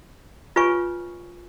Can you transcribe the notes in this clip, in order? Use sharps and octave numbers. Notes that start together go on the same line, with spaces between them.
F4 B4 C#5 G#5 C#6